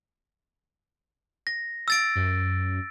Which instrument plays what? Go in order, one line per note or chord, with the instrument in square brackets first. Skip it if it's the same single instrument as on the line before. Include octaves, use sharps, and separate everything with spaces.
[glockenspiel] A#6
E6 A6 D7
[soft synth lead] F#2